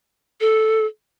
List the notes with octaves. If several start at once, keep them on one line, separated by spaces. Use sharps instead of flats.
A4